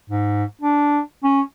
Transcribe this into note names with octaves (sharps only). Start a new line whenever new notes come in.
G#2
D4
C#4